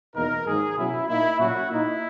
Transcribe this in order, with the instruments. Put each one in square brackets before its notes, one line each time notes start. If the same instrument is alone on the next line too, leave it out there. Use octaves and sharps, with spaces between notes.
[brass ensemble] E2 B2 A#3 D#4 A#4
G#2 D#3 F#3 A#3 G#4
B2 F#3 C#4 E4
A#2 A#3 D#4 E4
A#2 F#3 A#3 C#4 F#4
A#2 A#3 D#4 E4